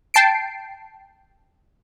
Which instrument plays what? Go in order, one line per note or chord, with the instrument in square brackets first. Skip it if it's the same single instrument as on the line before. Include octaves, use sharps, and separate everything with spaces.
[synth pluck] G5 A5 C7 D7